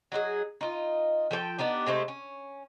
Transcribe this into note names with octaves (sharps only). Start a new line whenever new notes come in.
F#3 D#4 F4 G#4
D#4 F4
F3 A4 C5 G5
B3 D4 D#4 G4
C3 G#3 A3 C5
C#4